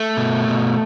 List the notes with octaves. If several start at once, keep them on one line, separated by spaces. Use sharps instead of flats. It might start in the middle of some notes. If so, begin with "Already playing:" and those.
Already playing: A3
B2
B2